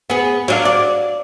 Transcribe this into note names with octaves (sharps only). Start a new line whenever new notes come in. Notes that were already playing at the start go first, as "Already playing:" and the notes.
B3 G#4
F#3 D4 F5
D5